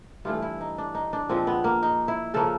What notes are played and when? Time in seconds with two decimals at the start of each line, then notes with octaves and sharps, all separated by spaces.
0.25 G2 E3 A3 F4
0.42 E4
0.61 D#4
0.78 D4
0.95 D#4
1.13 D4
1.29 A#2 F3 G#3 C4
1.47 B3
1.64 A#3
1.83 D#4
2.08 E4
2.34 C#3 F3 A#3 A4